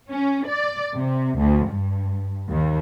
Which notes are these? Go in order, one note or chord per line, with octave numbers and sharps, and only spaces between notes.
C#4
D5
C3
D2
G2
D#2